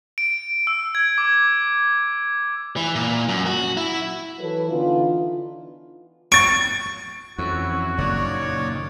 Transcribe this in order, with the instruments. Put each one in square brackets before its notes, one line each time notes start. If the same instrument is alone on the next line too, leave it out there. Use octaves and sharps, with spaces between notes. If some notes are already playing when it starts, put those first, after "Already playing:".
[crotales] D7
E6
G#6
D6
[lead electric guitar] E3
A#2
F#2
F#4
E4
[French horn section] E3 F#3 A4 B4
D3 E3 B3 D#4 F4
[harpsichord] C#6 [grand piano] A6 D7
[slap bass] F2 [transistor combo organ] E3 C#4 [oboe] F#4
[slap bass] F#1 [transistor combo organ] A#2 D#3 [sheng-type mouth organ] C#5 D5